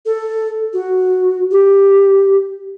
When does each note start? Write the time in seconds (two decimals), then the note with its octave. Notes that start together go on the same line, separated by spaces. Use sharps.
0.06 A4
0.73 F#4
1.51 G4